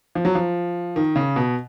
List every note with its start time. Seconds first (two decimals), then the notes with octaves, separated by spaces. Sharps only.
0.15 F3
0.25 F#3
0.35 F3
0.96 D#3
1.16 C#3
1.36 B2